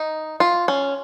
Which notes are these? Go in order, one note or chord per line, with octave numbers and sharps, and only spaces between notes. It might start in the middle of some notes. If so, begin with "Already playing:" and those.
Already playing: D#4
F4
C#4